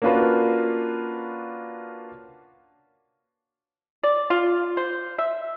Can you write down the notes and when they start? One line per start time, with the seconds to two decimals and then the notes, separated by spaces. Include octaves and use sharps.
0.02 A#3 C#4 D4 F4 F#4 B4
4.03 D5
4.30 F4
4.77 C5
5.18 E5